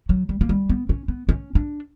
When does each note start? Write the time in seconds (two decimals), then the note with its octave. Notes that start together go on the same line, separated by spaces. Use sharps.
0.09 F#3
0.29 G3
0.41 A#3
0.49 G3
0.69 B3
0.89 C#4
1.08 B3
1.29 C#4
1.55 D4